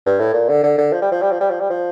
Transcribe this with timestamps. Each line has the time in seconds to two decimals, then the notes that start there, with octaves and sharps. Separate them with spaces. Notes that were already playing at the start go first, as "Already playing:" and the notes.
0.06 G2
0.19 A2
0.34 A#2
0.49 D3
0.63 D3
0.78 D3
0.93 F3
1.02 G3
1.11 F3
1.22 G3
1.32 F3
1.40 G3
1.50 F3
1.60 G3
1.70 F3